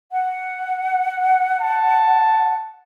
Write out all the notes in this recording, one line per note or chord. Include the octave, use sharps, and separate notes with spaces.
F#5
A5